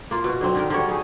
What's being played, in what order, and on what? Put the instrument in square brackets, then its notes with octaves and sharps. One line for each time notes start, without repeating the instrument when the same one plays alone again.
[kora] A#3 F4
B2 F#4
D3 F#3 C4
D3 D#3 A#4
D3 G3 C#5
A3 D#4 G#4